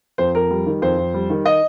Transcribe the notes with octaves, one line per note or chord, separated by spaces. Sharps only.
F2 C5
F2 A#4
G3
D#3
F2 C5
F2
G3
D#3
D#5